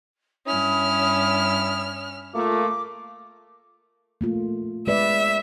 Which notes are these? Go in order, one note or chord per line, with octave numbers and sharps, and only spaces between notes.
G2 C#4 E4 D#6 F6
A3 A#3 F4 D6
A3 A#3 F4
G#3 B4 D5 E5